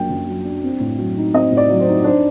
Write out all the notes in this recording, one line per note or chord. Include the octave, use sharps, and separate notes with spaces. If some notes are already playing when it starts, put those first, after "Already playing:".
Already playing: F#2 F#3 A#3 D4 G5
F#2
F#3
D4
C4
A2
F#3
D#4
C4 D#5
A2
D5
F#3
C5
D#4
D4 C5